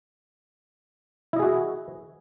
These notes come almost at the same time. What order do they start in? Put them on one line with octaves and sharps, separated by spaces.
E4 D#5 G#4 F#4